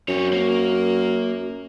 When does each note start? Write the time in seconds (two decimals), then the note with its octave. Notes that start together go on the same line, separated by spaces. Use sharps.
0.08 F#2 C4 F#4 C#5
0.33 A#3